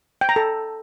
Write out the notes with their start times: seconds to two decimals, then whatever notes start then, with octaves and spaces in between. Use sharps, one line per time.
0.21 G5
0.29 A#5
0.36 A4